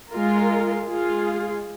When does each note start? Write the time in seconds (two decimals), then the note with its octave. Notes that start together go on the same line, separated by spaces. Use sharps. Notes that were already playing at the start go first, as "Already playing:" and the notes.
0.11 G#3 F4 A#4
0.89 G#3 F4 G#4